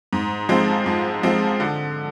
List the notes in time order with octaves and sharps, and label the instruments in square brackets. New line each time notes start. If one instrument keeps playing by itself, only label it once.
[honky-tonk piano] G#2
F3 G#3 C4
G#2
F3 G#3 C4
D3